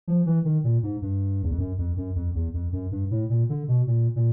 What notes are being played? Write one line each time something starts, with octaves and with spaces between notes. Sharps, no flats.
F3
E3
D#3
A#2
G#2
G2
E2
F2
F#2
F2
F#2
F2
E2
F2
F#2
G2
A2
A#2
D3
B2
A#2
A#2